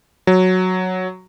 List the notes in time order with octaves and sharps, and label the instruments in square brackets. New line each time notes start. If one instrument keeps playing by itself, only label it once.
[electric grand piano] F#3